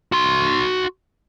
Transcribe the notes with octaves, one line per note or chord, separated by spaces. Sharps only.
F#4 C6